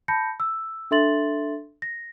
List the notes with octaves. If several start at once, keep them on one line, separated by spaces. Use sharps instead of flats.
A5 B5 G6 A#6 C#7
E6
D4 A4 E5 C6 A6 F#7
A#6